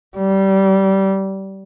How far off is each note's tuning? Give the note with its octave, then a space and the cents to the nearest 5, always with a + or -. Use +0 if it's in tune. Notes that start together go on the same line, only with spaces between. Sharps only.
G3 -20